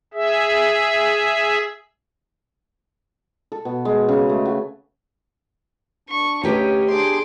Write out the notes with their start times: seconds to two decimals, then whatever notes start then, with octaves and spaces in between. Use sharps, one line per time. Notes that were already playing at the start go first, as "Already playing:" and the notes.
0.14 G#4 E5
3.52 A4
3.65 B2
3.85 G#3
4.08 C#3
4.29 A3
4.45 F#4
6.09 D4 C#6
6.43 D2 C#4 G4 B4 D#5 G5 A#5
6.90 D4 G#4 C6 D6